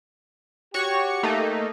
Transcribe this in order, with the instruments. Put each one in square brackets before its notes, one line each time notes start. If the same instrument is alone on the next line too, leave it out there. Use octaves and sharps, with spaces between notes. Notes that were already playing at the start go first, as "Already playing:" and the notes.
[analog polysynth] F#4 C#5 C#6 [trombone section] G4
[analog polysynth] A3 A#3 D#4